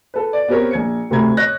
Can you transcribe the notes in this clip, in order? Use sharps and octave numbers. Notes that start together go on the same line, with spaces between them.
A4 B4
D5
B3 C4 G4 A#4 C#5
A#1 G#6 C#7
D2 C3 A3 A#5 B5 G#6
C#5 D#5 F#6 A#6